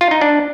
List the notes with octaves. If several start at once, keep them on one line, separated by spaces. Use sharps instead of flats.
F4
D#4
D4